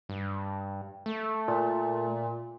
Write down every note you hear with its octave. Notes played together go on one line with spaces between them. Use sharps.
G2
A3
A#2